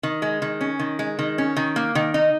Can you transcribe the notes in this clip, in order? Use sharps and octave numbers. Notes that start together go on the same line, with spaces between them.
D#3
G#3
D#3
C#4
D#3
G#3
D#3
C#4
D#3
A#3
D#3
D#4